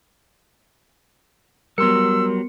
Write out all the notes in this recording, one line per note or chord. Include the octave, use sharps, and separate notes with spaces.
F#3 G3 B3 A#4 C6 E6 C#7